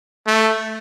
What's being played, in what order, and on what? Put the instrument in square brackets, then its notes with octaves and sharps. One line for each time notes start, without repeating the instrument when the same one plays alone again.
[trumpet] A3